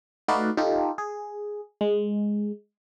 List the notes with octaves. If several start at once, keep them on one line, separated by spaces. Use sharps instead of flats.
A3 D#4 F#4 B4 D5 F5
D#4 F4 G4 A4
G#4
G#3